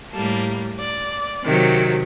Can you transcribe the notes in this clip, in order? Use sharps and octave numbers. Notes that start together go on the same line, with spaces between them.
A2 G3 A#3 A4
D5
C3 D#3 F#3